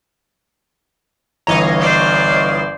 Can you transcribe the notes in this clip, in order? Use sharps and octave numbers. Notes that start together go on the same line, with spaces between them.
G1 E3 C#5 D#5 F5 A#5
C5 D5